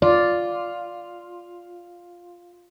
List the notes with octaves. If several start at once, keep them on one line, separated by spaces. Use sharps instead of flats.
F4 D5